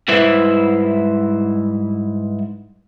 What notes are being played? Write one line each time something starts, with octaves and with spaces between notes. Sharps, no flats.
G#2 G3 E4 B4 C5 E5